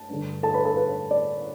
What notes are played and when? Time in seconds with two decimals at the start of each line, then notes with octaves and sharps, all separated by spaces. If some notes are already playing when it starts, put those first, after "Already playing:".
Already playing: A5
0.09 G2 D3
0.43 A4 A5
0.54 B4 B5
0.65 A4 A5
0.77 B4
1.11 D5